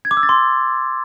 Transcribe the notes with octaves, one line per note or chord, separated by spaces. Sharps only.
G#6
D6
E6
A6
C6